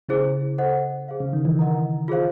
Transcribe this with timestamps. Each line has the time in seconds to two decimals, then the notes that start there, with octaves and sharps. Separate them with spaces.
0.09 C#3 E4 G#4 C5
0.58 A4 C5 D#5 F#5
1.08 G#4 C5 F5
1.20 C#3
1.33 D#3
1.45 E3
1.59 A#4 D#5 F#5 A#5
2.08 F4 G#4 C5 F5